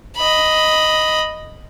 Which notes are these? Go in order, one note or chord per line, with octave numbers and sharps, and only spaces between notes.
D#5 B5